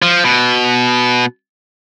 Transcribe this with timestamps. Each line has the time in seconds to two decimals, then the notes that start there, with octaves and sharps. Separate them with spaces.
0.02 F3
0.25 B2